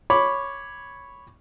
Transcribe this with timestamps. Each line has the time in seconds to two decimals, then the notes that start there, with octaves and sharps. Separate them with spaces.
0.10 C#5 B5 D6